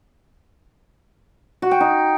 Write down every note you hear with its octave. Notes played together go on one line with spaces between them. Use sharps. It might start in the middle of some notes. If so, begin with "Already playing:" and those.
F#4
G5
D#4